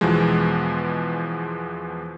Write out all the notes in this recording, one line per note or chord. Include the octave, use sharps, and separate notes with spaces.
E2 B2 E3 F3 G#3